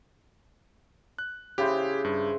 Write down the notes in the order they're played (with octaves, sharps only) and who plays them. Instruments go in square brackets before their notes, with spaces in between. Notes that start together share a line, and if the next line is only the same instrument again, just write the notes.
[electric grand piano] F#6
[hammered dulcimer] C#3 E4 C5 [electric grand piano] G4
[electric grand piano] G2